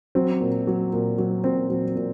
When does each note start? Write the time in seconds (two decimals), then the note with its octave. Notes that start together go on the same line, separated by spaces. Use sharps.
0.15 F#3 C4
0.40 A#2
0.67 F#3
0.93 A#2
1.18 F#3
1.44 A#2 C4
1.70 F#3
1.96 A#2